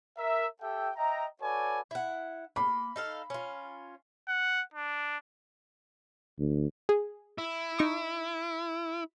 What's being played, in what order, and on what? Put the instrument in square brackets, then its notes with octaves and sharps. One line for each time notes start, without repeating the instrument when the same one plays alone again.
[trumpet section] A#4 E5
G4 A4 E5 G5
D#5 E5 G5 A#5
F#4 A4 B4 C#5 D5 G#5
[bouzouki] E4 F#5
[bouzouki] A#3 [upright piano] B5
[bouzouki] D#4 A4 F5
C#4 F4
[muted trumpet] F#5
D4
[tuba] D2
[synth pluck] G#4
[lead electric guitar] E4
[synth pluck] D#4 C#6 D#6